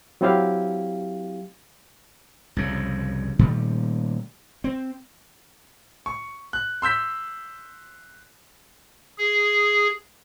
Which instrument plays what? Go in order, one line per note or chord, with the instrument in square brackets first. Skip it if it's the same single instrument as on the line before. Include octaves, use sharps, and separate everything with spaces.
[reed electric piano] F#3 C4 E4 G4 F5
[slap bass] C2 F2 C#3
A#2 D#3 G3 A3
C4
[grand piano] C#6
F#6
C6 E6 G6 B6
[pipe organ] G#4